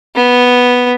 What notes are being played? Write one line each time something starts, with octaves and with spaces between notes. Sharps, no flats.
B3